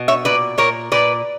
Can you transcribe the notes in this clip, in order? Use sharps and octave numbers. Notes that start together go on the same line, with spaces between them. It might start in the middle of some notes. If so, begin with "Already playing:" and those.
Already playing: B2
C#5 E5
A#2 B4 D5
A#2 A#4 C#5
A#2 B4 D5